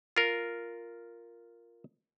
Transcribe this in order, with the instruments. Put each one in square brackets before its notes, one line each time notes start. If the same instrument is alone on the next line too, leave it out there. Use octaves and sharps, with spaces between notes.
[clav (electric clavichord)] F4 A#4